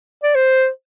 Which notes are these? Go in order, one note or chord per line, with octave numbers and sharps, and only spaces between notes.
D5
C5